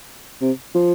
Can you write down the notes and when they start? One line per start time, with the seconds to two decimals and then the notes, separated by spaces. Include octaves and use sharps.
0.41 C3
0.74 F3